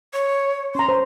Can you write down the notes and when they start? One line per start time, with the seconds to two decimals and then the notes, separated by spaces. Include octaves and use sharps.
0.14 C#5
0.75 C#4 A#5 C6
0.89 C5